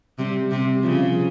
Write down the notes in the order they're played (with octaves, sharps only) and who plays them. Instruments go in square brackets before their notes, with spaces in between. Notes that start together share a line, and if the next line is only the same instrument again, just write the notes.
[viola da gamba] C3 [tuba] G3
[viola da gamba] C3
[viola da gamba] C#3 [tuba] F3